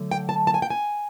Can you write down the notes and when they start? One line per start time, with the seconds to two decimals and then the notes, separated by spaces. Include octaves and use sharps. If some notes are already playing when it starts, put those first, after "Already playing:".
Already playing: D3 F#3 A3
0.11 G5
0.29 A5
0.47 A5
0.54 G#5
0.62 G5
0.70 G#5